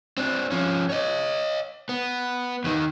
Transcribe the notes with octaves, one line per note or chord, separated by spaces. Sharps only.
C4 D4
F3 C#4
C#5 D#5
B3
D#2 D#3